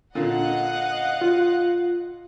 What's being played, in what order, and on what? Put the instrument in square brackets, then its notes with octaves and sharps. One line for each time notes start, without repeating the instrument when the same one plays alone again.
[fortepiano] A#2 D3 [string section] D#5 F#5 F#6 [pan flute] F5
[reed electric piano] F4